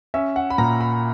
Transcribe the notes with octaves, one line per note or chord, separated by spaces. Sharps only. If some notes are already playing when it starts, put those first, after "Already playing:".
C#4 E5
F#5
B5
A#2 A#5
B5